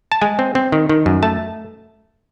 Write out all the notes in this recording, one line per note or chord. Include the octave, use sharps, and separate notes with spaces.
A5
G#3 G#5
C4
C4
D#3
D#3
F#2
A3 A5